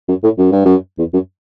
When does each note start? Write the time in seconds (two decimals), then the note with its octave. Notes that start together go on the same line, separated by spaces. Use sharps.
0.08 F#2
0.24 A2
0.38 F#2
0.52 G2
0.65 F#2
0.99 E2
1.13 F#2